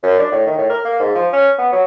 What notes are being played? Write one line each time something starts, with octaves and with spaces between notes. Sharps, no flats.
F#2
D4
A2
D#3
A2
A#4
A#3
G#2
F3
C#4
B3
F#3